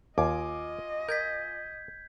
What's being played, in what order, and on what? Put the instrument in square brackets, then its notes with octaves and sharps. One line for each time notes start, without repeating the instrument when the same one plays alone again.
[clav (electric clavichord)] D#2 [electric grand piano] F4 G#5 D6 [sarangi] D#5
[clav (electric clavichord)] A#4 [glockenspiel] G6 G#6 B6